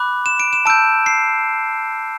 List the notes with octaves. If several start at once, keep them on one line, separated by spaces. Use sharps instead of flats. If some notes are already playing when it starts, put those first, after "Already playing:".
Already playing: B5 D6 F#6
E7
D7
E7
A5 E6 G6 D7
C7